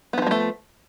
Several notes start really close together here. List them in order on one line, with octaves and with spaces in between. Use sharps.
B3 E3 F3 G#3 A3